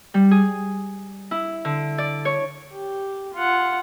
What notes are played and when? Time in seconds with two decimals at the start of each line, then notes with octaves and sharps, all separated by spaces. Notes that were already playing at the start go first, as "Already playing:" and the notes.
0.14 G3
0.31 G#4
1.31 E4
1.65 D3
1.98 D5
2.25 C#5
2.72 G4
3.34 F4 F#5